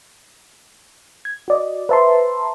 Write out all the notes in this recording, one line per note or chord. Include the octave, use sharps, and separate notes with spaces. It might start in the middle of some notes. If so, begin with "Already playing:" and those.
G#6
F#4 D5 D#5
B4 C5 E5 A5 A#5 C6